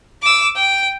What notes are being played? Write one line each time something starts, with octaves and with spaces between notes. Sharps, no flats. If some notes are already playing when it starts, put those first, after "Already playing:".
D6 E6
G5